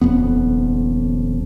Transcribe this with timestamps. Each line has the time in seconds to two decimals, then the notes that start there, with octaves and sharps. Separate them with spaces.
0.01 D#1 F2 B3